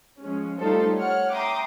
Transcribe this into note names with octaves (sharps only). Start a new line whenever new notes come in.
F3 G#3 C#4
G3 A3 D#4 F4 A4 C5
C#5 F#5 F6
E5 G5 A#5 C6 D6 D#6